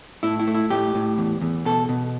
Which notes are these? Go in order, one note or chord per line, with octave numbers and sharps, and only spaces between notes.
A2 E4
E4
A3
E4
A2 G4
A2
E2
E2
B2 A4
B2